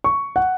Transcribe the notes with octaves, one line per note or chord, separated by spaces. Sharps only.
C#6
F#5